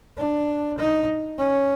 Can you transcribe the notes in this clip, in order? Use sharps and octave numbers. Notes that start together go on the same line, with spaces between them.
D4
D#4
C#4